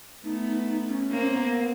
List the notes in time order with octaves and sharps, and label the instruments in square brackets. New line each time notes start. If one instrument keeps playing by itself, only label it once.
[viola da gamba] A3 B3 [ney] D#4
[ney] D#4
D#4
C#4
[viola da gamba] A#3 C4 [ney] C#4
[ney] B3
B3